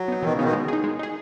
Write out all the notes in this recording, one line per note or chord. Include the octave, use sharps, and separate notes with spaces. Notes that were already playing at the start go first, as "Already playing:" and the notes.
Already playing: F#3
B3 D#4
B2 D#3 E3
C#3
B2 D#3 B3 D#4
G#3
D#4 G#4
G#3
D#4 G#4